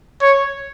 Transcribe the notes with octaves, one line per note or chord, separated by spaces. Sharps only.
C#5